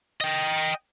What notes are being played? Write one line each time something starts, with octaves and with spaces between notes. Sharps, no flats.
D#5 G5